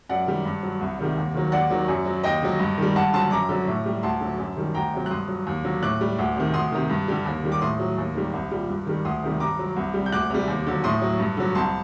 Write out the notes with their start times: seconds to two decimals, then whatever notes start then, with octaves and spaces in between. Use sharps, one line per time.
0.09 F#2 D5 F#5
0.27 D#3 G3
0.45 G2
0.63 F#3
0.81 C2
0.99 C3 D#3 G3
1.17 D#2
1.34 D#3 F#3
1.52 D#2 D5 F#5
1.70 D#3 F#3
1.88 F#2
2.06 F#3
2.24 D#2 D#5 G5
2.42 D3 F#3
2.59 G2
2.78 D#3 G3
2.96 G2 F#5 A5
3.13 D3 F#3 A5 C6
3.31 F#2 A#5 D6
3.49 D3 F#3
3.67 A2
3.86 G3
4.03 D2 A5 C6
4.21 D3 F#3
4.38 F#2
4.57 D#3 G3
4.74 D2 G5 A#5
4.93 C3 F#3
5.06 F#6
5.10 G2 C6 D#6
5.28 F#3
5.47 D#2
5.64 D3 F#3
5.83 A2 D6 F#6
6.01 G3
6.18 D2
6.36 C3 D#3
6.54 D2 C6 D#6
6.72 C3 D#3
6.90 G2
7.08 D3 G3
7.26 D#2
7.43 D#3 G3
7.52 D6
7.61 A2 C6 D#6
7.79 F#3
7.98 D#2
8.15 D#3 G3
8.33 C2
8.51 A#2 G3
8.69 G2
8.86 D#3 G3
9.05 D2 C6 D#6
9.23 C3 D#3 G3
9.40 G2 A#5 D6
9.59 F#3
9.76 C2
9.94 C3 G3
10.06 G6
10.12 D2 D6 F#6
10.30 C3 G3
10.48 D#2
10.67 D3 F#3
10.84 A2 C6 D#6
11.02 F#3
11.19 G2
11.37 D3 F#3
11.55 C2 A5 C6